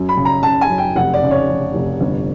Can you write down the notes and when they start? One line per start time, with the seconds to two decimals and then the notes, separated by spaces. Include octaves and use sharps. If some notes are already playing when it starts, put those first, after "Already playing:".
Already playing: F#2
0.09 B5
0.17 C#3
0.25 A#5
0.43 C#3 A5
0.61 G#5
0.69 F#2
0.78 G5
0.96 F1 F#5
1.14 D5
1.22 C#3
1.31 C#5
1.49 F1
1.74 F1
2.01 G1